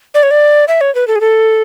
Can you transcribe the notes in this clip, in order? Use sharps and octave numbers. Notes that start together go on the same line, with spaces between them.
D5
C#5
D5
E5
C#5
B4
A4
G#4
A4